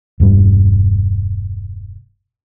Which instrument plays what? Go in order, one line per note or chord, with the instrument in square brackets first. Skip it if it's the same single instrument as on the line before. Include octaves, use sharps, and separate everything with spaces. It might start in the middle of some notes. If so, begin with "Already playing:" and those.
[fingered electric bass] E1 G2 G3